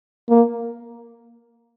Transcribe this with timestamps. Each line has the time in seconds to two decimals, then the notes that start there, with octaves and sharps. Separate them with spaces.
0.29 A#3